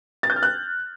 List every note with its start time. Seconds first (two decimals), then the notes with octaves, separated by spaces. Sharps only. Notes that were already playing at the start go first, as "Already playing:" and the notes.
0.23 A6
0.30 G6
0.36 F6
0.43 F#6